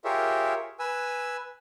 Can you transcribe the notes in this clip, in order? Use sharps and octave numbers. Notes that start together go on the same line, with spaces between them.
F4 G4 G#4 A#4 C#5 E5
B4 G#5 E6